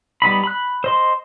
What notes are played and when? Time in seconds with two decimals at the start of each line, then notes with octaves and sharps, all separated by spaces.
0.22 G3 B3 D#4 B5
0.44 B5 F#6
0.84 C5 D#5 C6